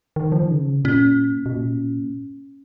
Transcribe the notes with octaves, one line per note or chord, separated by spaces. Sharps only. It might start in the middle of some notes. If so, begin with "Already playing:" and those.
D#3
F3
D#3
C#3
A#2 C#4
B2
A#2